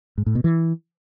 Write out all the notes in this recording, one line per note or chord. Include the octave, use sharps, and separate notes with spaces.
G#2
A2
B2
E3